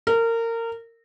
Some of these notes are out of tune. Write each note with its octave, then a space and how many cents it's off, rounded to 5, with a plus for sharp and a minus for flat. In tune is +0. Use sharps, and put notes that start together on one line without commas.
A#4 -25